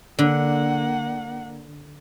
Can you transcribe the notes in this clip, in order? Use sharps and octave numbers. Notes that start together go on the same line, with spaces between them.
D3 A#3 F#5